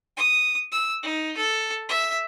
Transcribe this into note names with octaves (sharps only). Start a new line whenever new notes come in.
D#6
E6
D#4
A4
E5